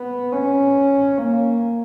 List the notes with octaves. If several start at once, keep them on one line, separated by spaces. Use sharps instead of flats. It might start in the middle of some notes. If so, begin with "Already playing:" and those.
Already playing: B3
C#4
A#3